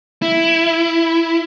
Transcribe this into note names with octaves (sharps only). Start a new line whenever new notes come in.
E4